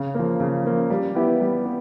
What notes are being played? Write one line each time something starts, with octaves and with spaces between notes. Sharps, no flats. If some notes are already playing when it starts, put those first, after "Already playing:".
Already playing: C#3
F3 A#3
C#3
F3 A#3
G3
B3 E4 G4
G3
B3